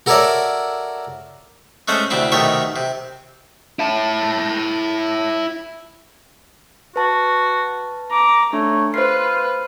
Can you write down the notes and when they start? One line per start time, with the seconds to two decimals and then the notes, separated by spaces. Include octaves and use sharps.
0.06 F#4 A4 A#4 C#5 D5 E5
1.88 G#3 A3 C#4 C5 F#5
2.10 D2 C3 C4 E4
2.32 B1 C3 D#3 A3 C#5 E5
2.76 C3
3.79 E4 A5
6.96 F#4 B4 A5
8.12 A#5 D6
8.53 A3 D4 C#5
8.94 F4 B4 C5 C7